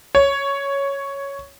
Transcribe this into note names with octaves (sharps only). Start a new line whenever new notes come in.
C#5